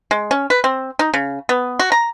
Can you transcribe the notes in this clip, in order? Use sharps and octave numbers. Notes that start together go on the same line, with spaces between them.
G#3
C#4
B4
C4
D#4
C#3
B3
F#4
A#5